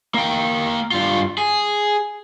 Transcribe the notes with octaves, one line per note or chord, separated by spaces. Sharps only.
A#3 G5
G2 F4
G#4